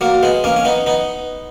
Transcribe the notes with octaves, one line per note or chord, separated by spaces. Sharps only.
F#3 A#3
G#3 B3
A#3 C#4
C#4
B3 D#4
B3 D#4